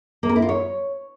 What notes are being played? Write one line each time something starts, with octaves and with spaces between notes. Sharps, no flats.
A#3
A#4
E4
F4
C#5